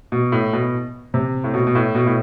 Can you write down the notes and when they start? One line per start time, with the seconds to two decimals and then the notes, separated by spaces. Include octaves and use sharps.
0.12 B2
0.32 A2
0.53 B2
1.14 C3
1.44 A2
1.54 B2
1.67 B2
1.75 A2
1.95 B2
2.07 A2